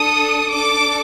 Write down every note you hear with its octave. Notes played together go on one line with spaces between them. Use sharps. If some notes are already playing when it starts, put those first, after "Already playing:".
Already playing: D4 A4 D#6
D4 A4 D6